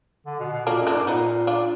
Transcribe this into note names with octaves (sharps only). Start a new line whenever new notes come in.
D3
B2
B2
A#2 A#3 D4
F#2
A#3 D4
G#2
A#2 B3 D#4
D4 F4